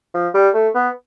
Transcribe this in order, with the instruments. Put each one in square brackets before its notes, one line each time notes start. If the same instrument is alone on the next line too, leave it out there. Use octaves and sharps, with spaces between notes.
[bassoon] F3
G3
A3
B3